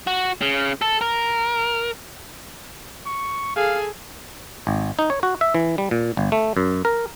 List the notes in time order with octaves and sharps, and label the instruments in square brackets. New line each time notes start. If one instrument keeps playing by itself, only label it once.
[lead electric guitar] F#4
C#3
A4
A#4
[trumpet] C#6
[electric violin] G#4 A4 [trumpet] F5
[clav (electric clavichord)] G#1
D#4
C#5
F#4
E5
E3
G3
A#2
G1
A3
F#2
A#4